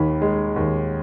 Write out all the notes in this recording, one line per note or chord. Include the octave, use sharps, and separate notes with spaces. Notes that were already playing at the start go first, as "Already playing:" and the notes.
Already playing: D#2 D#3 B5
G#3
D#2